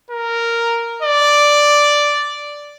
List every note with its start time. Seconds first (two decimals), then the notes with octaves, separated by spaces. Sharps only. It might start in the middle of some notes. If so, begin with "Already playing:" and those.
0.10 A#4
1.02 D5